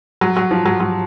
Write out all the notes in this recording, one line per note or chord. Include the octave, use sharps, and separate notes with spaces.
F#3
F#3
F3
F#3
F#3